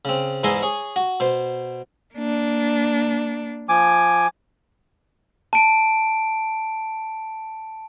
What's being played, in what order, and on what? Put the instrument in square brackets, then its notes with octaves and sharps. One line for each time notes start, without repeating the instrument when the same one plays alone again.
[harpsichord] C#3 C4
E2 G#2 E4 G#5 A#5 C6
G#4 C#5
F#4
B2 C5
[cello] A#3 D4
[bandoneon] F3 G#5 D6
[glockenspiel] A5 D7